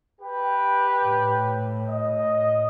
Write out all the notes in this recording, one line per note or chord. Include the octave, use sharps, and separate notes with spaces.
G4 B4 G5
A2
D#5